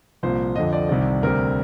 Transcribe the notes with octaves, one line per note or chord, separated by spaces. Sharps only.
C2 A#2 F3 C5
F2 D3 F3 D#5
D5
C2 C3 D#3 G3 D5
D2 C3 G3 A#4